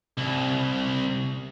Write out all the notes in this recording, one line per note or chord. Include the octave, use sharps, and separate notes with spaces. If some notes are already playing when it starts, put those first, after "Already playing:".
C2